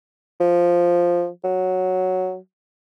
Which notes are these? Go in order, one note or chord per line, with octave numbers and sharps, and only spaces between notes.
F3
F#3